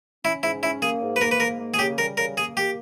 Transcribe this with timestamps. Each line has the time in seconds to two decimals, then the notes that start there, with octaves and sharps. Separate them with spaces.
0.25 C#4 E4
0.43 G#2 E4
0.63 C#4 E4
0.82 A#3 G#4
1.02 G#2
1.16 B4
1.21 A#3 A#4
1.31 B4
1.40 G#2 A#4
1.60 A#3
1.74 G#4
1.79 C#3 G4
1.98 G3 A#4
2.17 C#3 A#4
2.37 A#3 G#4
2.56 A#3 G4